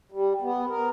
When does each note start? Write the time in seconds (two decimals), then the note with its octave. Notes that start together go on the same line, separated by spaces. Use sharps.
0.12 G3
0.41 B3
0.69 A#4